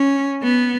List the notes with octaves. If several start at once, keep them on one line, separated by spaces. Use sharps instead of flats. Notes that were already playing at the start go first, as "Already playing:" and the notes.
Already playing: C#4
B3